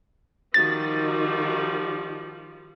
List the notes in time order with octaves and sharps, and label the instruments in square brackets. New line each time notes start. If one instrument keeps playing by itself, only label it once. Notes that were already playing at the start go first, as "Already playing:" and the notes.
[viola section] D#3 D#4 F#4 [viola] F3 G3 [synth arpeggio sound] A6